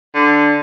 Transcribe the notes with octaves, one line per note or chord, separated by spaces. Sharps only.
D3